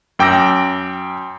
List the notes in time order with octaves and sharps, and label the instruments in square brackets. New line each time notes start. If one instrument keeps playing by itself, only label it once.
[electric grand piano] F#2 G5 D6 E6 A#6